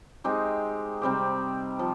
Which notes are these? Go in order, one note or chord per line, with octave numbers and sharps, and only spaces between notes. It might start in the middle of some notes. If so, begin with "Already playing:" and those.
G#3 C4 D#4 G4
C3 G3 C4 G4
F3